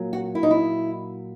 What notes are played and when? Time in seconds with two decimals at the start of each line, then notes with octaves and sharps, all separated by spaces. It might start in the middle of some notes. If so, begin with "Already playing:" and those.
Already playing: A#2 F#3
0.13 F#4
0.35 E4
0.43 D#4
0.51 E4